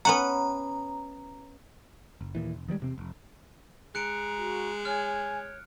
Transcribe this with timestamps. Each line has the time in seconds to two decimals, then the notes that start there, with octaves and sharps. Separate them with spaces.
0.05 B3 C#4 F#5 A#5
2.21 F#1
2.35 D#2 A#2 E3
2.54 F1
2.68 D#3 F3 G3 G#3
2.80 E1 C3 C4
2.98 F1
3.95 G#3 A#5 F#6 C#7 D7
4.37 F#4
4.85 C#5 G#5 F6